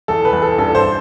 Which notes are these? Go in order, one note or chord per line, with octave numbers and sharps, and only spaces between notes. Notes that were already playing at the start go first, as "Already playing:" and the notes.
E2 A4
B4
E2
A4
G2 A4
C5